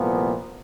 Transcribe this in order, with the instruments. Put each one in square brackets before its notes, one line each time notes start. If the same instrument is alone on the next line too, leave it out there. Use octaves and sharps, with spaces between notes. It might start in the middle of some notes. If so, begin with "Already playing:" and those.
Already playing: [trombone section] C2 A#2 F3 A3 B3